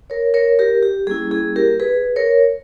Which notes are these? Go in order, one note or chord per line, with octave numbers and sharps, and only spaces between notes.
A#4 C#5
A#4 C#5
G4 A#4
G4
G3 A#3 C#4 E4 G#4
G#4
G4 A#4
G#4 B4
A#4 C#5